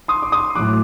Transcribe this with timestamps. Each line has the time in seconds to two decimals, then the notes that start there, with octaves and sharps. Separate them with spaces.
0.08 C6 D#6
0.22 D6
0.32 C6 D#6
0.55 A2 F#3 D6 F#6